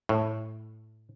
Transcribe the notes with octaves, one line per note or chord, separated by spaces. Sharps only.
A2